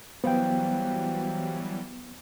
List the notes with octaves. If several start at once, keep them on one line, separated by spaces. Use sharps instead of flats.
E3 F#3 G3 B3 C5 F5 G5